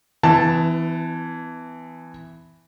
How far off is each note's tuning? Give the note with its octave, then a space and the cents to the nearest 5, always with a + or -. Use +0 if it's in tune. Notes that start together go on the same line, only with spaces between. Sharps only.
E3 +0 B3 +40 A5 +0